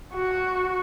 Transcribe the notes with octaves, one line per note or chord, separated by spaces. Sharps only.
F#4